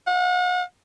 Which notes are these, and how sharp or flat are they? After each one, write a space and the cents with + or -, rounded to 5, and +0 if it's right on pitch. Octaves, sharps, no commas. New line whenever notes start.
F#5 -40